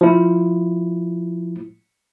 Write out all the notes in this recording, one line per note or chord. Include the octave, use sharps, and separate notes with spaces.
F3 E4